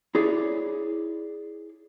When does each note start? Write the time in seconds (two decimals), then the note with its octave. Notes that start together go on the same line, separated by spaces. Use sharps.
0.15 E4 G#4 C#5 D5